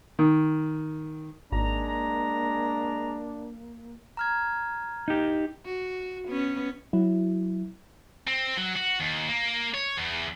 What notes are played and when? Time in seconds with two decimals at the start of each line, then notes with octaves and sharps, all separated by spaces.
0.19 D#3
1.52 G#1 G#3 A#3 D4 A#5
4.17 A#5 F6 G#6
5.08 D#4 G4
5.65 F#4
6.28 B3 C#4
6.93 F#3 E4
8.27 C4
8.57 F#3
8.76 F#4
9.00 D#2
9.28 A#3
9.74 C#5
9.97 E2